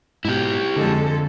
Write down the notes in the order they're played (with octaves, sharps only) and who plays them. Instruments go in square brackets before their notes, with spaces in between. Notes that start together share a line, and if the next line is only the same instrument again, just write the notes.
[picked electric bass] G#2 B2 [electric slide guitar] E4 G4
[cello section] F2 G#3 A4 [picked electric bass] D3